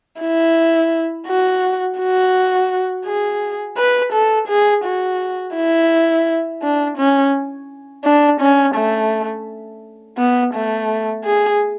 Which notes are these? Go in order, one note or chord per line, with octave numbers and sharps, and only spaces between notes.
E4
F#4
F#4
G#4
B4
A4
G#4
F#4
E4
D4
C#4
D4
C#4
A3
B3
A3
G#4